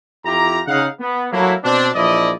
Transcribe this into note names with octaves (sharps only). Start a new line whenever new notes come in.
F2 E4 F4 G4 A#5
C#3 D#4 F5 F#5
B3
F#3 A3 A#3 E4
B2 C4 D4
A#1 E3 F3 E4 D5 D#5